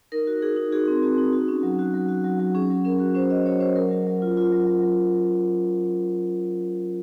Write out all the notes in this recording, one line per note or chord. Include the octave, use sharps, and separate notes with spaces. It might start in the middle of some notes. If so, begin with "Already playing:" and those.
D#4 A#4
F#4
D#4 G#4
D#4
F#4 G#4
C4
C4 F#4
D#4
F#4
C#4
F#3
F#4
F#3
F#4
F#3
F#3
C#4 G#4
F#3
C#4 A#4
F#4
C#4 C5
F#4 D#5
F#3 C#5
C#4 C5
F#3 A#4
F#3
F#3
F4
F4
F#3
F#3
F#3